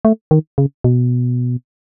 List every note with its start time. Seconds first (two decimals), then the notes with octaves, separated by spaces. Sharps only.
0.05 A3
0.31 D#3
0.58 C#3
0.84 B2